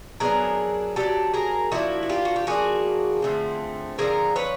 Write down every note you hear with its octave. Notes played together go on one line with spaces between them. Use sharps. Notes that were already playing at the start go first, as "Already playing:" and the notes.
F#3 B3 D4 G#4 A#4
F#3 B3 D4 G4 A4
G#4 A#4
F3 A#3 D4 E4 F#4
F#4
F4 G4
F#4
G4
F3 A#3 D4 F#4 G#4
D3 F3 A3 C4
D3 F3 A3 C4 G#4 A#4
B4 C#5